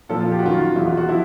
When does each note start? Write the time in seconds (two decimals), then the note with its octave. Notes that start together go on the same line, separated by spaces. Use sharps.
0.09 A#2 F3 A4
0.21 F4
0.32 G4
0.39 F#4
0.43 F#2 D#3 F4
0.53 F#4
0.76 E2 B2 E4
0.87 F4
0.97 F#4
1.09 F3 E4